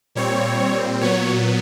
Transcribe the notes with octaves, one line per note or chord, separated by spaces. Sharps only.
A#2 G3 C4 C#5
A#2 F#3 B3 C#5